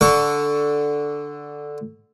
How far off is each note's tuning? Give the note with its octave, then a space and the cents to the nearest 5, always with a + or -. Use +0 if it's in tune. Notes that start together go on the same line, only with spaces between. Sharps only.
D3 +0 A4 +0 C#6 +15